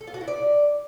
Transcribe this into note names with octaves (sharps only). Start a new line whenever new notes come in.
A4
F4
F#4
E4
D5